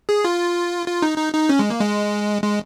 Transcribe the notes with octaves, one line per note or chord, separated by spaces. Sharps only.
G#4
F4
F4
D#4
D#4
D#4
C#4
G#3
A#3
G#3
G#3